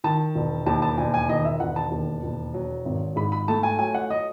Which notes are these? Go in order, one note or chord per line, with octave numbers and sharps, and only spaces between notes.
D#3 A5
E1
D#2 A5
A5
E1 G#5
G#5
D#3 D#5
E5
E1 F#5
A5
D#2
E1
F#3
G#1
G#2 B5
B5
A3 A5
G#5
F#3 G#5
F#5
D#5